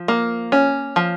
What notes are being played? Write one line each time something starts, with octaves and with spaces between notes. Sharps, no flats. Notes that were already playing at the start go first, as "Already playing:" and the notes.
Already playing: F3
A#3
C#4
F3